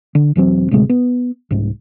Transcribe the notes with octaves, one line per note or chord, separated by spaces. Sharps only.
D3
E1 E3 F#3 C4
D2 A2 C3 G#3
B3
C2 G#2